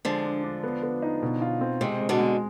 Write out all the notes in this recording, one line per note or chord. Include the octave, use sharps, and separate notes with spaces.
D3 F3 G#3
D4
D4
B3
B3
D#4
B2
F4
C4
C3 D#3 G#3
G#3
B2 D3
G#3